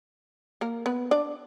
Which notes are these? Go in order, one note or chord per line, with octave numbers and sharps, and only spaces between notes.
A#3 A#4
B3 B4
D4 D5